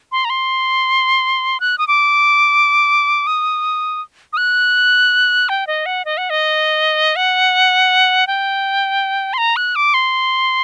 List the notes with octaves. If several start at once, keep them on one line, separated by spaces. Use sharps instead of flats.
C6
A#5
C6
F#6
D#6
D6
D#6
D#6
F#6
G5
D#5
F#5
D#5
F#5
D#5
F#5
G5
C6
A#5
F#6
D6
C6